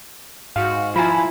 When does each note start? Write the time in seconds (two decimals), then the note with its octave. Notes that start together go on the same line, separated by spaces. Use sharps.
0.56 G#2 F#4 F5
0.96 F3 E4 F4 G#5 A#5 B5